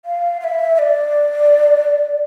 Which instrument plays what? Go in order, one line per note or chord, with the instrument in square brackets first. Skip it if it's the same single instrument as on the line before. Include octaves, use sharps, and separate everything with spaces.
[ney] F5
F5
E5
E5
D5